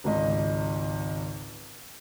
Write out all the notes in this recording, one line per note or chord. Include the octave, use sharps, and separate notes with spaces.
G#1 C#2 D#5